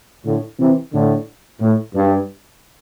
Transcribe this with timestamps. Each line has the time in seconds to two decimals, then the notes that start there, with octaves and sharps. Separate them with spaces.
0.25 A2 D3
0.59 C3 E3
0.93 A2 D3
1.61 A2
1.95 G2